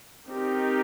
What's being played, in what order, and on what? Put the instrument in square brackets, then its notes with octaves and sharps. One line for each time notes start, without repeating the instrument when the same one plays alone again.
[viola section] C4 D#4 G4 A#4